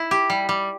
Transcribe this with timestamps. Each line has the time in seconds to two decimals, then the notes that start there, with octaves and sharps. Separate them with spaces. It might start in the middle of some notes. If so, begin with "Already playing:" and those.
Already playing: E4
0.11 G4
0.30 G3
0.49 G3